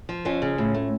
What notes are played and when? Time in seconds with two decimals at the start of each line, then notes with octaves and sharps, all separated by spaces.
0.09 F3
0.25 F2 C#4 F4
0.42 C#3
0.58 A2
0.74 A3